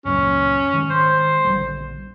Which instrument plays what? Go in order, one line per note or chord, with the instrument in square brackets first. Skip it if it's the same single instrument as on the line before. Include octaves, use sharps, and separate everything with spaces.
[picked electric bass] C#2 F#2 A#2 [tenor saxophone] C#4
[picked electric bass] D#3 G#3
[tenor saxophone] C5
[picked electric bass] A#1 D3 G3